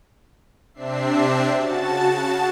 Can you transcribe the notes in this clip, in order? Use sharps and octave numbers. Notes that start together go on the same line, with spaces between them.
C3 C4 D4 E5 C7
C#3 F#4 A5 A6